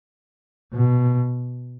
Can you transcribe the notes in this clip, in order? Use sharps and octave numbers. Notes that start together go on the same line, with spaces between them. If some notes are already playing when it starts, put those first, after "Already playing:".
B2